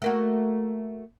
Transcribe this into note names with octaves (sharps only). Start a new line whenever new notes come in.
A3 A#3 F#4